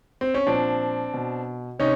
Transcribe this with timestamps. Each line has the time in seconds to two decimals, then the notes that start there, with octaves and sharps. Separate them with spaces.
0.21 C4
0.34 C#4
0.47 A#2 F3 C4 D4
1.14 B2
1.79 C3 C#4 D#4